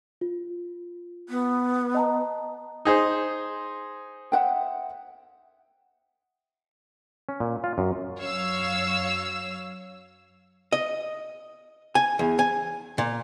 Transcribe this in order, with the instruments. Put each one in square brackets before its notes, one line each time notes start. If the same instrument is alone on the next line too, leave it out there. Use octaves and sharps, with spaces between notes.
[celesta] F4
[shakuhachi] B3
[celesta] D#5 A5 A#5
[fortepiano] D#4 G#4 C5
[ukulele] E5 F#5 G5
[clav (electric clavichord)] C#4
A#2
F4
F#2
[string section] F#2 F#3 C#5 F5 E6
[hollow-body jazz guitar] D#5
G#5
E2
G#5
A#2